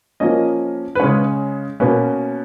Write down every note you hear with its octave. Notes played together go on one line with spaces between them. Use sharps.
F3 A#3 C#4 D#5
B4
C#3 G#3 C#4 C#5
B2 A#3 C#4 B4